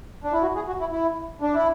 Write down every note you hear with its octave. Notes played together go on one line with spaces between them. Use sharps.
D4
E4
F#4
G#4
F#4
E4
E4
D4
E4